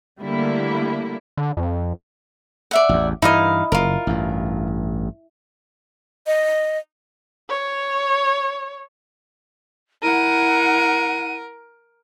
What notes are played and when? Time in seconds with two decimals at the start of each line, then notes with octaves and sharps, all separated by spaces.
0.20 D3 G3 A3 A#3 E4
1.37 D3
1.57 F2
2.71 D5 E5 F#5
2.89 A1 E2
3.22 G2 E3 D#4 E4 D#5 F5
3.72 F#1 F4 A#4
4.07 A1 G2
6.27 D#5
7.49 C#5
10.03 E4 A#4 F#5 D#7